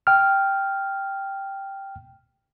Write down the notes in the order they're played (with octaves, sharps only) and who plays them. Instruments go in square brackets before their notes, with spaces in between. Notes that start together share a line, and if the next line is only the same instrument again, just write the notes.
[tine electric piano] G5 F6